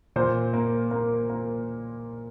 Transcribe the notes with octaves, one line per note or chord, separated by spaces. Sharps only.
A#2 C5
A#3
A#3
A#3